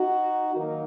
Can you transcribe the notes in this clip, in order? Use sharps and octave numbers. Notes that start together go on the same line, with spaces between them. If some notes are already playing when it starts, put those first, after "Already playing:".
Already playing: D#4 F#4
D#3 F#3 A#3 D#4 F#4 A#4